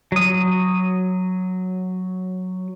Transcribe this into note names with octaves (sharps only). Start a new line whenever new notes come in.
F#3 D#6